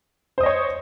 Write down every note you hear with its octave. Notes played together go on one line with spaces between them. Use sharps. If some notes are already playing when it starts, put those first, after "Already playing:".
C5 C#5 D#5 D#6